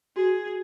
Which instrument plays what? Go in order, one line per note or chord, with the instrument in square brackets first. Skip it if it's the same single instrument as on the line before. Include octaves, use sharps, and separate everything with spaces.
[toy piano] F#4 [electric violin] G#4